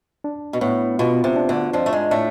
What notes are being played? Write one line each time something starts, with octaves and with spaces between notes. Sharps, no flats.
D4
B2
A2 B3
B2 F4
C3
D4
D2 D3
F2 F3 D4
A3
G#2 G#3
A2 A3 D4